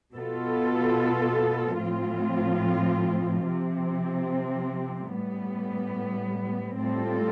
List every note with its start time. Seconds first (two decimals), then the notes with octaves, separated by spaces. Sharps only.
0.15 B2 B3 F4 A4
1.81 A2 F3 C4 F4
3.47 C3 F3 C4
5.13 A2 G3 B3
6.79 A2 G3 C4 F4 A4